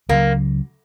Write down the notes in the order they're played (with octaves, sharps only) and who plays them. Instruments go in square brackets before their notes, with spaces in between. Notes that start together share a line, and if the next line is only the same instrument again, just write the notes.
[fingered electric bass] C#2 C#3 F#3 [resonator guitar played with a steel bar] A#3